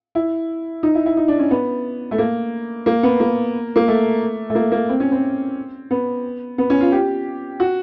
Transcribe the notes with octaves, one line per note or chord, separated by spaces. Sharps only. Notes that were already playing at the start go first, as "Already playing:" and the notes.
E4
D#4
E4
E4
D#4
D4
C#4
B3
A3
A#3
A#3
B3
A#3
A#3
A3
A3
A#3
A#3
C4
C#4
C4
B3
B3
C#4
F4
G4
F#4